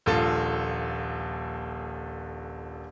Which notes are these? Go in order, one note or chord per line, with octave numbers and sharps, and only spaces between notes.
D#1 A#1 F4 A4 F5 A6